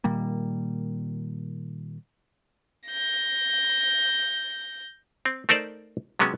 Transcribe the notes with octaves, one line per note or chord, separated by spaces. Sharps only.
A#2 D#3 G3 A#3
G6 A#6
C4
A3 D#4 A#4 C5 D5
C3 F#3 G#3 B3 C#4